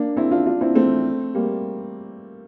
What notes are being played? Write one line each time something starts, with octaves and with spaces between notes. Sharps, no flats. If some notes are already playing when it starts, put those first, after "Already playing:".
Already playing: A#3 D4
C4 E4
D4 F4
D4 F4
C4 E4
A3 C4
G3 A#3